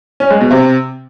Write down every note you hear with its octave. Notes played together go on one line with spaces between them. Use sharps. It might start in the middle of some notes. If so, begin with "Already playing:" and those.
C#4
G#3
B2
C3